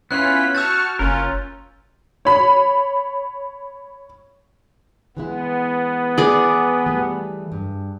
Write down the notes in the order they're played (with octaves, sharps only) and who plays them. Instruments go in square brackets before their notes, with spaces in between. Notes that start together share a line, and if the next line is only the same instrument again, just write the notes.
[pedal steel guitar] B3 E4 F4 [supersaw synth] C#4 B6 [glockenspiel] F#6
[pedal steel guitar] F#4 [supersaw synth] A5 C#6 F6 [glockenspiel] E6 G6 A6
[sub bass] F#1 [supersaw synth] C#4 [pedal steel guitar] F4 A#4
[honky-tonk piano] C#5 B5
[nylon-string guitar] E3 G#3 E4 [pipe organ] B3
[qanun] G#4 D5
[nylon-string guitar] E3 G3 A3
G2